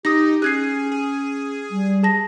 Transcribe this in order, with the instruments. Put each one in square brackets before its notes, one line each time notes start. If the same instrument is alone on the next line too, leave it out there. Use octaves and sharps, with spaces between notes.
[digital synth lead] D#4 [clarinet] G4 [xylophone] D#6 A#6
[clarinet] C#4 [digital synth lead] G#4 [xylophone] F#6 G#6 C7
[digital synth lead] G#4
[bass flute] G3
[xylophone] G#4 A5 A#6